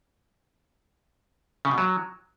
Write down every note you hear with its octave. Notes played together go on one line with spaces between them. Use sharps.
C#3
B2
F#3